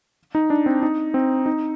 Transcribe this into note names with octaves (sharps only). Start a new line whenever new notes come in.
D#4
D4
C4
D#4
C4
D#4